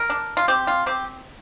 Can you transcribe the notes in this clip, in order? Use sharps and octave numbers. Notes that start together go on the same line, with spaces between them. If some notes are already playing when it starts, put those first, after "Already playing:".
Already playing: A#4
D4
F4
C4 G4
F4
C4 G4